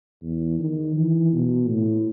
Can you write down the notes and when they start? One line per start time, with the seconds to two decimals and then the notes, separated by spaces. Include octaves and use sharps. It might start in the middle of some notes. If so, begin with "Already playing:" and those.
0.22 E2
0.59 D#3
0.96 E3
1.33 B2
1.68 A2